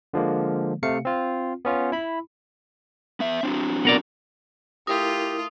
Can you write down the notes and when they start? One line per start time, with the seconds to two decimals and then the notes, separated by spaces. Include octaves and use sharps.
0.14 D3 F3 G#3 A#3
0.83 C3 A3 F5 C#7
1.05 C4 F4
1.65 B3 C#4 F4
1.92 E4 B5
3.20 B3 E5
3.43 C4 D4 F#4
3.85 B3 A#4 D5
4.87 A3 E4 F4 G4 A#4 D#6